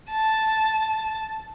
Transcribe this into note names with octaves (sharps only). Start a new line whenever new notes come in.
A5